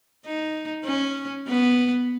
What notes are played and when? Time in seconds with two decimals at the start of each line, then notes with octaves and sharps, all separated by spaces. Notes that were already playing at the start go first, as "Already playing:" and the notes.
0.25 D#4
0.86 C#4
1.48 B3